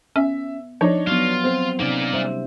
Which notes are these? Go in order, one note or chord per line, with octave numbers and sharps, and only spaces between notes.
B3 C#4 E5
F3 D4 D#4 C#5
F#3 B3 F4
C4
C3 A#3 C#4 D#4 D5
G3 C5 E5